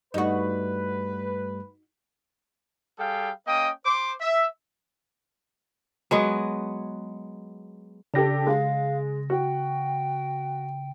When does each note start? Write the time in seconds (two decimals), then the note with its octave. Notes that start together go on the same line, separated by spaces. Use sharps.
0.14 G2 G3 A3 D#4 F#4 B4
2.99 G3 G#4 A4 F5 G5
3.47 A#3 C#4 D#5 G5 D#6
3.86 C5 D6
4.21 E5
6.11 F#3 G#3 B3
8.14 C#3 D4 G4 A4 A#6
8.47 G#3 F5
9.30 F#4 G5